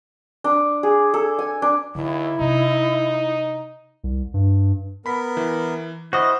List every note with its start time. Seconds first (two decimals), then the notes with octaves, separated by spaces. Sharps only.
0.44 D4
0.83 G#4
1.14 A4
1.39 G#5
1.62 D4
1.95 D#2 D3 E4
2.39 C3 D4 D#4
4.04 C2
4.34 G2
5.06 B3 A#4 B5 B6
5.37 E3
6.13 E4 F#4 C5 D#5 F#5 F6